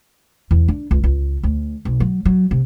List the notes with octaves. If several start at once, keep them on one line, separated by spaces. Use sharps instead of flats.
E2
D4
C#2
C#2
D2
B1
F#3
F#3
C3